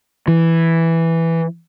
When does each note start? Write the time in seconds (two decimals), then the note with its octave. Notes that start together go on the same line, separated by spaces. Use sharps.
0.28 E3